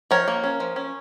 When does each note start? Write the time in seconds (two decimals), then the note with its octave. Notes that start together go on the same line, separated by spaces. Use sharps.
0.11 F3 A#4 C#5
0.28 A#3
0.44 C#4
0.60 F3
0.76 C#4